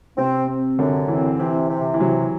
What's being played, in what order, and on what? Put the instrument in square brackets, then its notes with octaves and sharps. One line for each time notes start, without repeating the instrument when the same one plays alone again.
[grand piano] C3 [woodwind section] C4
[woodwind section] C4
[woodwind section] F#2 [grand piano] D3
[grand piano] E3 [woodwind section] C4
[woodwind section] C3 [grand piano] E3
[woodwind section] C3
[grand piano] E3
[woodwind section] C3 [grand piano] F#3